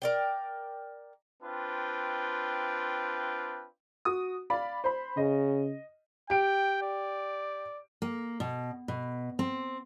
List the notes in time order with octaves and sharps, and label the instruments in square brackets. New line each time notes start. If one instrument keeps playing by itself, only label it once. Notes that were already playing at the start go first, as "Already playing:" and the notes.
[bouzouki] A#4 D5 G5
[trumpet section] C4 D4 F4 B4 G5
[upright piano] F#4 D#6
D5 F5 B5
C5 B5
[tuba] C#3 [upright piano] D#5
[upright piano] G4 D7 [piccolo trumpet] G5
[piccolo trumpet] D5
[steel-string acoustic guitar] A#3
B2
B2
C4